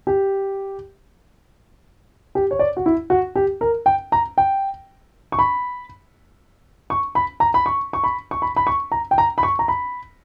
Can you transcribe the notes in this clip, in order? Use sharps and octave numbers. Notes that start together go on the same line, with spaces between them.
G4
G4
C#5
D5
F#4
E4
F#4
G4
A#4
G5
A#5
G5
C#6
B5
C#6
B5
A#5
B5
C#6
C#6
B5
C#6
B5
B5
C#6
A#5
G5
A#5
B5
C#6
A#5
B5